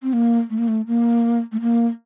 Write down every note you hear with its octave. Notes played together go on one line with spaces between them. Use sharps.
C4
A#3
A3
A#3
A3
A#3
A3
A#3